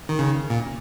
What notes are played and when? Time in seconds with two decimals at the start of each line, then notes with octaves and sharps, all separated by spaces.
0.09 D#3
0.19 C#3
0.50 A#2